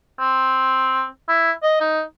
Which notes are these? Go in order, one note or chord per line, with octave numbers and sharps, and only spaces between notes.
C4
E4
D#5
D#4